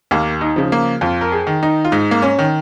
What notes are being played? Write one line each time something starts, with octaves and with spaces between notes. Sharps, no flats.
D#2 A#3
D#4
C#3 F3
A#3
F2 F4
A#4
G#4
D#3
D#4
F4
G#2 D#4
A#3
C#4
D#3